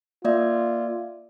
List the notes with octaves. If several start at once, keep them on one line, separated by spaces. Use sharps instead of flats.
A#3 F4 D5 E5